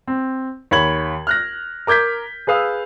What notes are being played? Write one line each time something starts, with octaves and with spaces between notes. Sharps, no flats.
C4
D#2 C#5 B5 G#6 F#7
F6 F#6 A#6
A#4 D6 G6 G#6 B6
G#4 B4 F5 D#6 E6